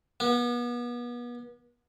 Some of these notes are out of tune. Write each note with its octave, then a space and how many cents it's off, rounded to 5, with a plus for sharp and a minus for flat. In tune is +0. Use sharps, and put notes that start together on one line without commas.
B3 -35